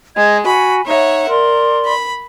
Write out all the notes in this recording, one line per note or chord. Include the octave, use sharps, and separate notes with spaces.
G#3 D#5 G#6
F#4 G#5 B5
D#4 C#5 E5 F#5
A#4 D5 C6
B5